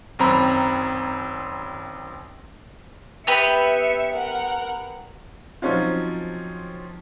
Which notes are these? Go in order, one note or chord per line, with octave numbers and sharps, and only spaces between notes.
G#1 F#2 C4 A#5 B5
B3 G4 B4 E5 C#7
A#4 F#5
F3 F#3 C4 C#4 D#4 F4